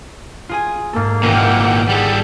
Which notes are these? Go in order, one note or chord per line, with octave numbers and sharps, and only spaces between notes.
F4 G#4 G#5
G#2 A#3 A4
G#1 A#2 E3 D#5 F#5 G5 D6
G3 G#4 A4